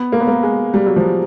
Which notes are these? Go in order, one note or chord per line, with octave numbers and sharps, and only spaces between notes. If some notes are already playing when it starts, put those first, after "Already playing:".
Already playing: B3
A#3
B3
A#3
G#3
G3
F#3
F3